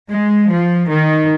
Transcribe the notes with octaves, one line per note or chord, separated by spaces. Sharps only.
G#3
F3
D#3